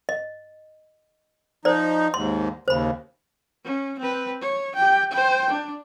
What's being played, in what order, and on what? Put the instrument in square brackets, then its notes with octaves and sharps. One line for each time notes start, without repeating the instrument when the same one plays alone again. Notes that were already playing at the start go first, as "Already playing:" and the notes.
[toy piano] D#5
[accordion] F3 D#4 [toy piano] C5 D5
[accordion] D#2 G#2 [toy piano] C6
[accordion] D#2 C#3 [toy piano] C5 B5
[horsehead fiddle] C#4
C4 B4
C#5
G4 G5
C5 G5
D4